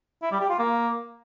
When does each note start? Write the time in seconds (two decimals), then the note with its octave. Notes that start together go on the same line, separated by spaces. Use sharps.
0.22 E4
0.31 G3
0.40 G4
0.50 F4
0.59 A#3